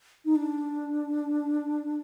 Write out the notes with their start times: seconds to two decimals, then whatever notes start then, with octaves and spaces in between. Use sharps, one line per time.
0.25 D#4
0.35 D4